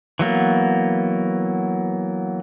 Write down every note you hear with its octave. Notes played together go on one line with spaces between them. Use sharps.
E3 F#3 A#3 B3